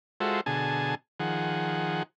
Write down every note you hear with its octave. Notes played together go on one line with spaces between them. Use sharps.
G#3 F4 F#4 A4 C5 E5
B2 D3 G#4 G#5 A5
D#3 F3 G#4 F#5